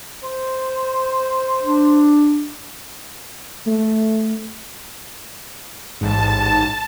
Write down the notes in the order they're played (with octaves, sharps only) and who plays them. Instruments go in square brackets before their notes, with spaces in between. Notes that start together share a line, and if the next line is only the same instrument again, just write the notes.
[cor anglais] C5
[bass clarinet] D4
[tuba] A3
[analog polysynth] A1 G#2 [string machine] A5